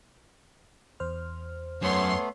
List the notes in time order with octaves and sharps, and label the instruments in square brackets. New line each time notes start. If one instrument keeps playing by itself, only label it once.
[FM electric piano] E2 C5 F6
[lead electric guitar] F#2 [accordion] A3 B3 [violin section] C#5 C6